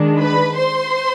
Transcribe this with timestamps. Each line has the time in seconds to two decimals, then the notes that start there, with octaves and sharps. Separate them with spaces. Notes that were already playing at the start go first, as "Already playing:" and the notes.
Already playing: D#3 G#3 D4
0.20 B4 B5
0.58 C5 C6